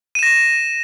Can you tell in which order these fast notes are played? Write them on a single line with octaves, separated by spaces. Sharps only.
D#7 E7 A#6